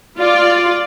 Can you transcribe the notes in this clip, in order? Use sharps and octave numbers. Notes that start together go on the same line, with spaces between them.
F4 D5